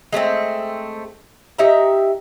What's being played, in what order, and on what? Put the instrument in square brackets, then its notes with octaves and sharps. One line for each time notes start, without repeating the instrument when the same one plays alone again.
[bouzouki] G#3 A3 B3 C4
D#4 G4 E5 A#5